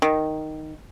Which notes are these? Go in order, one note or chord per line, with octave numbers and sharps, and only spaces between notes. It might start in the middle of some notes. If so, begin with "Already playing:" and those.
D#3